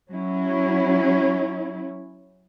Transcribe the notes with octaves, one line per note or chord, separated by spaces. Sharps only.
F#3 C#4 E4